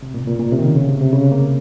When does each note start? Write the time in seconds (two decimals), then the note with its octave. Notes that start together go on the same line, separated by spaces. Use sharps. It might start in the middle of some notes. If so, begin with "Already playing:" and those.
0.02 C3
0.14 A#2
0.27 A#2
0.39 A#2
0.52 C3
0.59 D#3
0.64 C#3
0.76 C#3
0.89 C3
1.01 C3
1.13 C#3
1.32 A#3